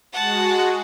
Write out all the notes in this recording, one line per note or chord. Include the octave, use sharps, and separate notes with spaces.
G#3 F#4 F#5 A5